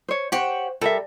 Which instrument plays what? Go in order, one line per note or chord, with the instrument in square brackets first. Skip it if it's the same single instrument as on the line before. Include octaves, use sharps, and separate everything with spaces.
[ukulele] C5 C#5
[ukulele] G4 [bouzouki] C5 C#5 F#5
[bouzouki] G3 [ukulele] A4 A#4 E5